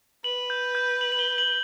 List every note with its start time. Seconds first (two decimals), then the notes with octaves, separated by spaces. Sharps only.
0.24 B4 F#7
0.50 G6
0.75 G6
1.01 F#7
1.12 F#7
1.19 G7
1.38 F#7